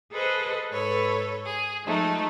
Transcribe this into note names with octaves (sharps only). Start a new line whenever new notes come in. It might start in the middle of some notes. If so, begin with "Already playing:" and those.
G#4 A4 B4 C5 D#5
G#2 A4 B4 C#5
G#4
F3 G#3 A3 D#4